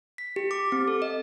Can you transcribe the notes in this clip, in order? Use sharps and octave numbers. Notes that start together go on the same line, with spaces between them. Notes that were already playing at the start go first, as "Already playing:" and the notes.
B6
G4
D6
C4
A4
D#5